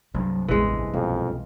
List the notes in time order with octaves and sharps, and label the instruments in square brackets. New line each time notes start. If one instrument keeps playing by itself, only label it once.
[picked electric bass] C2 G2 [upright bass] F#3
[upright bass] A1 E2 [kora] E3 G#3
[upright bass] B1 [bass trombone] F2